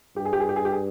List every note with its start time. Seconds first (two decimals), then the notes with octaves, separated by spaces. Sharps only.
0.16 G2 G4
0.25 G#4
0.33 G4
0.40 G#4
0.49 G4
0.56 G#4
0.65 G4
0.72 G#4